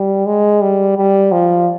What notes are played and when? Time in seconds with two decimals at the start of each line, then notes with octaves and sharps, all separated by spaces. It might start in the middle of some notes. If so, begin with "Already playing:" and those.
Already playing: G3
0.26 G#3
0.61 G3
0.97 G3
1.32 F3